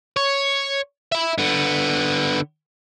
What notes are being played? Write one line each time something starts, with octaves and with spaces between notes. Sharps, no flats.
C#5
E5 B5
D3 B3